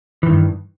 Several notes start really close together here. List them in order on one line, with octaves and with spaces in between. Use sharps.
E3 D#3 G2